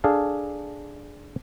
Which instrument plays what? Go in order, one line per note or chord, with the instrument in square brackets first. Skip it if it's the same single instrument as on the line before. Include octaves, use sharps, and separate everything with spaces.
[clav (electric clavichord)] D4 G#4 A4 F5